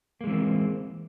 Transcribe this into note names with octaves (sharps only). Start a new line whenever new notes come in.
E3 G#3 A#3 C4